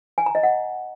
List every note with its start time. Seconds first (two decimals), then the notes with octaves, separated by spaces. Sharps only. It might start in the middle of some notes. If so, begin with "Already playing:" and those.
0.18 G#5
0.26 A#5
0.35 D#5
0.43 F#5